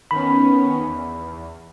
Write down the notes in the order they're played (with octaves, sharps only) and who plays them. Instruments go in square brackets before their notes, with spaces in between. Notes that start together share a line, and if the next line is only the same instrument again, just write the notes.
[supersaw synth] D#3 B3 C#4 [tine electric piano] B5
[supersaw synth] E2